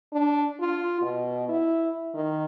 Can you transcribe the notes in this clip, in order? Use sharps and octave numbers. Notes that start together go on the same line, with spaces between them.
D4
F4
B2
E4
D#3